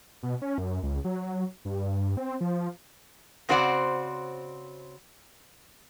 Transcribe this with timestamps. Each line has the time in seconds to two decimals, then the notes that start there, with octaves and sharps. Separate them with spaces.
0.23 B2
0.42 C#4
0.58 F#2
0.83 C#2
1.04 F#3
1.65 G2
2.17 C4
2.41 F3
3.49 C#3 C4 F#4 C5 D5 F#5